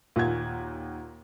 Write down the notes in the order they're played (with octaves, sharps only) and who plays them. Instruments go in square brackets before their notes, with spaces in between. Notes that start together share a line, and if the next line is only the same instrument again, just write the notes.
[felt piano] D#2 F#5 G#6 [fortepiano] A#2